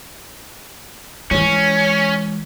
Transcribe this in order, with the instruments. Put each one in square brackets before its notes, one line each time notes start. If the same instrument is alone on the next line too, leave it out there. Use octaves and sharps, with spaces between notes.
[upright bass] E3 G#3 [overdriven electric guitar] C#4